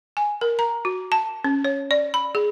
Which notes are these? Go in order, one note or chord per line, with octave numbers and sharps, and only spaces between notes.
G#5
A#4
A#5
F#4
A5
C#4
C#5
D5
B5
G#4